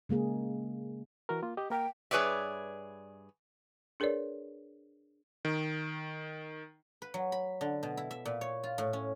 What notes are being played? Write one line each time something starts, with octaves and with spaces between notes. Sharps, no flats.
C#3 G#3 A#3 G#4
E3 F#4 A#4
A#3 F4
G4 D#5
A#3 A#4 G5
G2 G#4 B4 C#5 D5 E5
D4 G#4 A#4 B4 C#5 D5
D#3
B4
F#3
B5
D3
B2
E4
E5
A#2
C#5
F4
A2
C#4